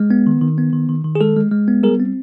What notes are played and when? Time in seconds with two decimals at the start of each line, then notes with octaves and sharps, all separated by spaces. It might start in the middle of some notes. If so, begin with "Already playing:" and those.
Already playing: G#3
0.11 B3
0.27 D#3
0.41 D#3
0.58 B3
0.73 D#3
0.89 D#3
1.04 D#3
1.15 G#4
1.21 G#3 A4
1.36 G#3
1.51 G#3
1.68 B3
1.83 G3 G#4 A#4
2.00 C4